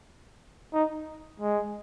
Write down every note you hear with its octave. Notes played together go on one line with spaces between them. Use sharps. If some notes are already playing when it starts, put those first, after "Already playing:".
D#4
G#3